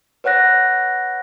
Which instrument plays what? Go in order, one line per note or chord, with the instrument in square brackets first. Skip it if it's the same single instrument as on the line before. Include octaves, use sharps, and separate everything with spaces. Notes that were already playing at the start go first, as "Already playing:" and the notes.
[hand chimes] B4 C#5 F#5 F#6 A#6